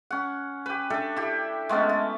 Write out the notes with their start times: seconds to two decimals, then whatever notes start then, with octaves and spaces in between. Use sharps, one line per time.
0.10 C#4 F#5
0.66 G4 B4
0.90 D4 A4 E5 G5
1.16 E4 G4
1.69 G#3 A3 B3 C#4
1.89 A5